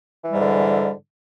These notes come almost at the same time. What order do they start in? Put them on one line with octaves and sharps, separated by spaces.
E3 G3 G#2 D3